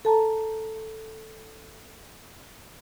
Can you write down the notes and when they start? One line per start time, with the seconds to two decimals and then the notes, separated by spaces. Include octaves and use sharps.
0.05 A4 A5 A#5